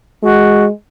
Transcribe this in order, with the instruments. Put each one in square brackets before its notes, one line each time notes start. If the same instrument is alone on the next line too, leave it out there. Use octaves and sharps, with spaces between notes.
[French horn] G#3 [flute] F#4